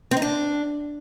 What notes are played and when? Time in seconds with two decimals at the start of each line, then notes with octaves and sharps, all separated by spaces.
0.11 C4
0.17 D#4
0.22 D4